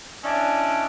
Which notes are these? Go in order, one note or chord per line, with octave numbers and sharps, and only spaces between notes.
C#4 D4 E4 D5 D#5